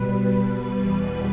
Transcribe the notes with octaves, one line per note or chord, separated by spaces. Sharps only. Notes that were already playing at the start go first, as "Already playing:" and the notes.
Already playing: B2 G3 B4
B4
E2 B2 G3